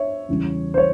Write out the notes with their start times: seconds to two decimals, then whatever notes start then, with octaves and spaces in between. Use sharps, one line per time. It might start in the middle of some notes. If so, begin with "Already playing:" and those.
Already playing: C#5 E5
0.29 E2 C#3 G3 C#4 E4
0.74 C5
0.78 C#5